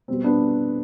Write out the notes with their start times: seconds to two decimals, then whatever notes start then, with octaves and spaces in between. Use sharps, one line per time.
0.08 B2 G3 B3 C4
0.24 B3 D4